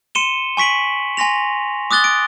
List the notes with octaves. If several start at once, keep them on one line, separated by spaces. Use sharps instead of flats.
C6 C#7 D#7 E7 G7
G#5 C#6 B6 D7 F#7
G#5 C6 A#6 F7
D6 D#6 F#6 A6 G7
D7